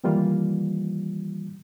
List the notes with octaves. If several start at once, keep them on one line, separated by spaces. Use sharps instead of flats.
D#3 E3 G3 A#3 F4